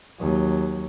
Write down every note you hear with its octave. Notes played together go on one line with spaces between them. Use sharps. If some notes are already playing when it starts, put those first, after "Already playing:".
D#2 F#3